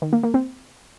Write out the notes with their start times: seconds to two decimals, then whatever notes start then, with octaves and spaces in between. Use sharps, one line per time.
0.02 D#3
0.13 A#3
0.23 A#3
0.34 C4